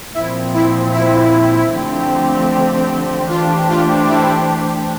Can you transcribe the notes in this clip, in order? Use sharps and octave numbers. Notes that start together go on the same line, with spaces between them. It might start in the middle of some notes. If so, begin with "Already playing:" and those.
A#2 F3 C4 E4
E4
E4
D3 F3 A3 C4 G4
E3 A3 D4 F4 G4 C5
F4
E4